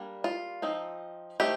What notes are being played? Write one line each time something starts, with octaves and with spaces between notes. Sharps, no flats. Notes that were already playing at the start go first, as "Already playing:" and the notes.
Already playing: G3 A#3 D4
F4
F3 C4 D#4
D#3 A3 C4 G4